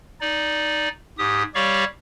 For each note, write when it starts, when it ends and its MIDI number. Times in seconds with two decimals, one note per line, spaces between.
0.21 0.89 63
0.21 0.89 74
1.18 1.43 44
1.18 1.43 67
1.18 1.43 87
1.55 1.84 55
1.55 1.84 67
1.55 1.84 73
1.55 1.84 74
1.55 1.84 77
1.55 1.84 85